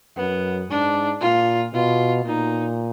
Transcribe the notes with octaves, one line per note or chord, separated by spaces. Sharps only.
F#2 B3
G#2 D4
A#2 F4
B2 F4
A#2 D#4